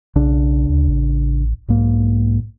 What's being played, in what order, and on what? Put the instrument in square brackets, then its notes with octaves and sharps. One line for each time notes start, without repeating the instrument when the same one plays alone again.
[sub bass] B1 [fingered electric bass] C#3 D4
[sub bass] D2
A1
[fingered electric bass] B1 A#3 [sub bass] G#2